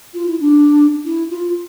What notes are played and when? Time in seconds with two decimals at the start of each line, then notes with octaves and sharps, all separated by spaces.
0.14 F4
0.27 E4
0.40 D4
1.05 E4
1.31 F4